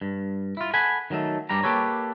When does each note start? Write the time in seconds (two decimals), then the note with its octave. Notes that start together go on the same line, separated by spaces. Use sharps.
0.01 G2
0.57 E4 F4
0.73 A4 F#5 G#5 B5
1.10 D#3 F#3 A3 A4
1.49 G2 G3 D4 A#5
1.63 A#3 G4 A4 B4 C#5